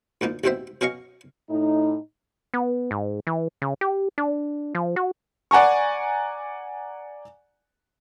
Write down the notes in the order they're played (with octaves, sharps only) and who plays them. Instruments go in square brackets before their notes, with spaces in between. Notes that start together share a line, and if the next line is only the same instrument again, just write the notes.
[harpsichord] D2 A#2 A#3 D#4
A1 D#2 B2 C4 C5 E5
B2 C#4 F#4 D#5 F5 C#6
[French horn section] A2 D#4
[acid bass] B3
G#2
E3
C#3
G4
D4
F3
F#4
[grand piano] D5 F#5 G#5 A#5 C#6